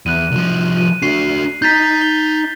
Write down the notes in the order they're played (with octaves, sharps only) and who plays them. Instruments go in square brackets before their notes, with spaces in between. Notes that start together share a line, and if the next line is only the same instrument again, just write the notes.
[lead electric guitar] E2 [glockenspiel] F#6 D#7
[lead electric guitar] C2 F3
[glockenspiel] D#7
[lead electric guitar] D4 F#4 [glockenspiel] C7
[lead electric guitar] D#4 A#5 [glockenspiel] G6 A6 B6
[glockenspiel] G7